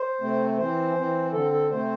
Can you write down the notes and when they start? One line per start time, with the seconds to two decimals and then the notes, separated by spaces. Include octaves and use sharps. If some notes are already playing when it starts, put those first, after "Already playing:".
Already playing: C5
0.21 C3 A3 C4
0.58 E3 C4 C5
0.95 E3 C4
1.32 D3 C4 A4
1.51 A4
1.70 C3 A3 C4 C5